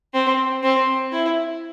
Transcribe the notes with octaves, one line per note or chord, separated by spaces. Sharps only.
C4
C4
E4